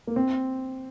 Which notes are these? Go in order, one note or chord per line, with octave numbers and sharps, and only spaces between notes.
A#3
C4